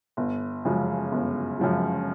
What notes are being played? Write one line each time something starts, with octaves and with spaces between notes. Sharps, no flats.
G1
F#2 C#3 F3 G#3
G1
F#2 C#3 F3 G#3